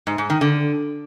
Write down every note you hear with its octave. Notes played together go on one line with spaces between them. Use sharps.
G#2
G#2
D#3
D3